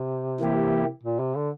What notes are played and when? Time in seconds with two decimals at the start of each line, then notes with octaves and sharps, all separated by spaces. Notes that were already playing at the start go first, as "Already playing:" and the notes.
Already playing: C3
0.40 E3 A#3 E4 G4
1.03 A#2
1.19 C3
1.35 D3